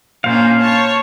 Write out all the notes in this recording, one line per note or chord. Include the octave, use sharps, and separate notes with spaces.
A#2 C#4 D4 C5 F5
C#5 A5